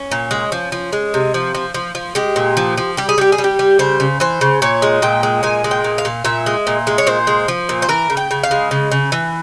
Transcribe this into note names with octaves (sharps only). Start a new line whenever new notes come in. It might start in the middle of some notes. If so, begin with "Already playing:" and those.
Already playing: C#4
A#2
G#3
F3
F3
G#3
C3
F3
F3
F3
F3
G#3 G4
A#2
F3
F3
G3 G4
G#4
G3 G4
G#4
G3
G4
G3
C#3 C5
C#3
E3 C5
C#3
A#2 C#5
G#3
A#2 G5
G#3
A#2 G#5
G#3
G5
A#2
F5
A#2
A#2 E5
G#3
A#2
G#3
C#5
A#2 C5
G#3
F3
A#2
C5
E3 A#4
C#3
G5
C#3
F5
G#3
C#3
C#3
E3